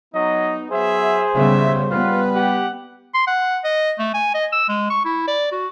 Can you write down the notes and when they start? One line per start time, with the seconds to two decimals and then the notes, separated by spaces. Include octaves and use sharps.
0.15 F#3 B3 D#4 D#5
0.71 F#3 B3 G#4 C5 E5
1.35 D#2 C#3 G3 B3 E5
1.91 G3 B3 F4 B4
2.35 G4 F#5
3.14 C6
3.27 F#5
3.64 D#5
3.99 A3
4.14 G#5
4.34 D#5
4.52 E6
4.69 G#3
4.90 C#6
5.05 E4
5.27 D5
5.52 F#4